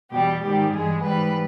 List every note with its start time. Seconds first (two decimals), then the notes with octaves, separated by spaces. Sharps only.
0.11 E2 B2 G3 G4
0.41 G#2 D#3 G3 G4
0.72 G2 E3 G#3 G#4
1.03 G#2 E3 G3 B4